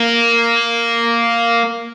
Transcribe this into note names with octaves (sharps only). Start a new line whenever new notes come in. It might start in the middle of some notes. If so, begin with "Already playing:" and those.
Already playing: A#3